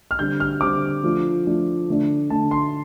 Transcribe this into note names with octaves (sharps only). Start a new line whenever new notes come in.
F6
D3 G3 C4 G6
F6
D3 G3 C4 D6
F3 A3 D4
F3 A3 D4
D3 A3 D4
D3 A3 D4 A5
C6